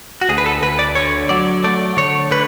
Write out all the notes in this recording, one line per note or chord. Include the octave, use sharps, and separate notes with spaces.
F#4
D2 G#4
B4
A4
D2 B4
D5
D3 C#5
F#3 D5
A3 D5
D3 C#5
D3 B4